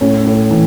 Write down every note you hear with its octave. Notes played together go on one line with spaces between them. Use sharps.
A2 C#4
A2
E3